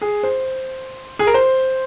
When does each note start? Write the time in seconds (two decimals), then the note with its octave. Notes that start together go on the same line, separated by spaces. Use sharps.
0.02 G#4
0.23 C5
1.19 G#4
1.27 A#4
1.34 C5